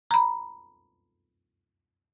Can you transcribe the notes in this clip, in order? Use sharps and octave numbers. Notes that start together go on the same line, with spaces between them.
A#5 B5